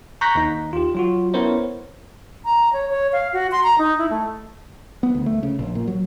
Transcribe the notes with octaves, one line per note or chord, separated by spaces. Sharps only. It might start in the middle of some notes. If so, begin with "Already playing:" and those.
A#5 C#6 F#6 G6 A#6 B6
D#2 D#4
F4 G4
F#3 F4 F#4
B3 C#4 E4 A#4 C5 C#5
A#5
C#5
C#5
F5
F#4
C6
A#5
D#4
E4
A3
B3
D2
A3
C#3
A#1
A#2
F#3